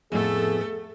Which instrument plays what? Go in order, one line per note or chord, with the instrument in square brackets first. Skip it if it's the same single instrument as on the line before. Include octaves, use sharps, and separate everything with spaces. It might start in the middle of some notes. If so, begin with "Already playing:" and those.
[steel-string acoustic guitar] F2 A2 B3 [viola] A3 A4 [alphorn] G#4